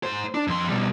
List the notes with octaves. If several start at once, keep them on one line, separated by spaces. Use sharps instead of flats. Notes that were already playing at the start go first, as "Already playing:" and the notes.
G#2 C5
D4
F2 C6
B2 G3